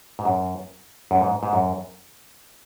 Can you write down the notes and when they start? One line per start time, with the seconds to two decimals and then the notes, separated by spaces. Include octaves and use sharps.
0.19 G#2
0.25 F#2
1.11 F#2
1.21 G#2
1.43 G#2
1.53 F#2